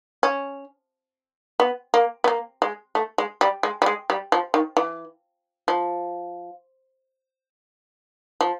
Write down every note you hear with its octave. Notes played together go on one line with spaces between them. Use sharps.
C#4
B3
A#3
B3
A#3
G#3
A3
G#3
G3
G#3
G3
G#3
G3
F3
D#3
E3
F3
F3